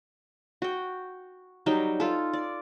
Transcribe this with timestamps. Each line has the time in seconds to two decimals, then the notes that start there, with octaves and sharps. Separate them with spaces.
0.62 F#4 G5
1.66 F#3 G3 D#4 G5
2.00 F4 A4
2.33 D5